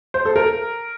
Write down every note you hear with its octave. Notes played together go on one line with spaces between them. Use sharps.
C5
A4
A#4